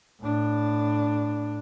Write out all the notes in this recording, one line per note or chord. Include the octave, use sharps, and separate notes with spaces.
A2 D4